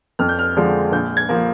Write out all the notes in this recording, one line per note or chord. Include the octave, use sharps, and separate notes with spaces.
F2 F6
G6
F6
D3 F3 G#3 D4
A#1 G6
G#6
F3 A#3